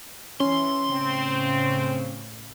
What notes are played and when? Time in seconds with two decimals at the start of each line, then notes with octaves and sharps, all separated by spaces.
0.40 E3 C#4 C6
0.91 A2 C#3 C4